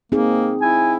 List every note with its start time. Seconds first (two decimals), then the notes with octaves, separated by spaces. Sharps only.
0.12 A#3 C4 D#4 G#4
0.62 E4 G#5